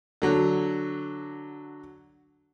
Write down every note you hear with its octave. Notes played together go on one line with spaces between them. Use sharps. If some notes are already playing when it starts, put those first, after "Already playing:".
D3 F#3